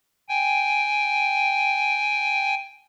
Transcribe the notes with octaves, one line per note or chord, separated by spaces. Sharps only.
G5 G#5